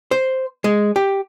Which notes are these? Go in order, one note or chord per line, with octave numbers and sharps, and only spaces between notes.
C5
G#3
G4